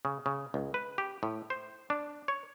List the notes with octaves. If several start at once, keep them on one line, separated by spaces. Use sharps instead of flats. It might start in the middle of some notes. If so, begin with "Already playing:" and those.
C#3
C#3
C#2
B4
G4
A2
C5
D4
C#5